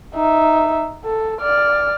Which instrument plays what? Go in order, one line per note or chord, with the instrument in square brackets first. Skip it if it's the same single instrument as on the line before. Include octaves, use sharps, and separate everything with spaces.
[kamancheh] D#4 E5
A4
D5 F6